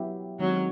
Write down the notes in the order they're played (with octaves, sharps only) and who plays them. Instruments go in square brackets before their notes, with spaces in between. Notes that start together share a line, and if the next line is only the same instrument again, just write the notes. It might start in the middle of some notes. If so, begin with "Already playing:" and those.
Already playing: [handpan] F#3 B3 E4 G4
[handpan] D#3 G#3 C4 D#4 [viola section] F#3